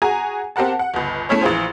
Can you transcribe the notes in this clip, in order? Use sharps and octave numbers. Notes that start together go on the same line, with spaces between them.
F#4 G#4 G#5 A#5
C4 G4 A#4 F#5 A5
F#5
G1 C#2
A3 C#4 E4 C#5
A#1 E3 F4 G#4 C5